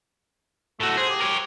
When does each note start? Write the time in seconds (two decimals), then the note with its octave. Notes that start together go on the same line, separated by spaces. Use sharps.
0.81 A2 A3 F#4
0.98 G#4 C5
1.09 G4
1.21 A#4 C#5